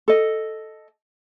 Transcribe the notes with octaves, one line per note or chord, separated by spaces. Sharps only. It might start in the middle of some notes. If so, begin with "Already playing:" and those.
A4 D#5